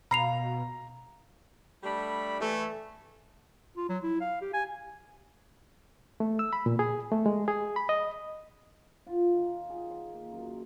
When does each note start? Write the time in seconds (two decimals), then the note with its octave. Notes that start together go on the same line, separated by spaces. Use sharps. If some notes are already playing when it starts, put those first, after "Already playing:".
0.11 B2 A#3 F4 A#5 B5 C7 F7
1.84 G3 A3 D4 B5
2.40 E3 A3
3.77 F4
3.89 F#3
4.03 E4
4.21 F5
4.41 G4
4.53 G#5
6.20 A3
6.39 E6
6.53 B5
6.66 A#2
6.79 G#4
7.12 A3
7.26 G#3
7.48 G#4
7.76 B5
7.89 D#5
9.07 F4
9.34 D#3
9.70 G#4
9.91 C6
10.14 A#3
10.32 F#2